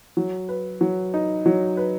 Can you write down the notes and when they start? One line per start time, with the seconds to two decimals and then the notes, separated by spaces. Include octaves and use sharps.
0.17 F#3
0.49 B4
0.81 F#3
1.14 D#4
1.46 F#3
1.77 B4